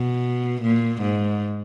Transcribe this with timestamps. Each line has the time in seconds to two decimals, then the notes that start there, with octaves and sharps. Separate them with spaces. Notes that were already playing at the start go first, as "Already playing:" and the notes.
Already playing: B2
0.62 A#2
1.02 G#2